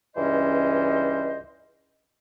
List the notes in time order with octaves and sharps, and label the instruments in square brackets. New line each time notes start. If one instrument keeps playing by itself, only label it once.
[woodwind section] C#2 G2 E3 C#4 C5 D#5